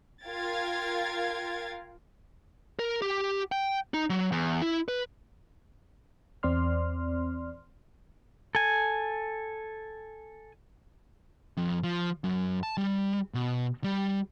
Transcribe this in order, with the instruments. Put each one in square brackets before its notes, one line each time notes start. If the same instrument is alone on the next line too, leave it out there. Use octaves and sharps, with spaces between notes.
[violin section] F4 A#4 F5 G5 G#6 A6
[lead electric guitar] A#4
G4
G5
D#4
F#3
E2
E4
B4
[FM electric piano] E2 C4 D5 C6 F6
[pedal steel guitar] A4 G#5
[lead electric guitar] F2
F3
F#2
A5
G3
B2
G3